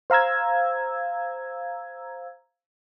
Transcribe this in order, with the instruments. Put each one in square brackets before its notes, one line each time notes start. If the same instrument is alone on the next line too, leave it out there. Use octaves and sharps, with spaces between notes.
[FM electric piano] C5 F5 A#5 E6 G#6